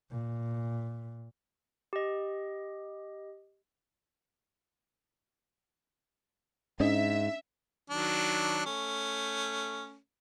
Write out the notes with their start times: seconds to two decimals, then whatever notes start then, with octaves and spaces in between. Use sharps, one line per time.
0.11 A#2
1.93 G4 D#5
6.80 G#2 C#4 D4 D#5 E5
7.90 D#3 F#3 D4
8.66 A3 C#4